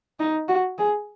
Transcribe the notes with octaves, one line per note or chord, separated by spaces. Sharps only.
D#4
F#4
G#4